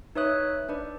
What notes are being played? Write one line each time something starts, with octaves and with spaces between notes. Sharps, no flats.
D#4 B4 C#5 E5 D#6 F#6
D4 B4 D5